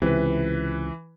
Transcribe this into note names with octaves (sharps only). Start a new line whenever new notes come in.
C#2 C3 E3 B4